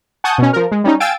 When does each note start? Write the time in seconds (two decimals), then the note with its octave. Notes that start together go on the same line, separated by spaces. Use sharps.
0.24 F#5 G#5 A5 C#6 D#6 G6
0.38 B2 C#4
0.53 F3 A#4
0.71 G#3
0.84 G3 C#4 D#4
1.00 F5 G5 G#5 E6 A6 D7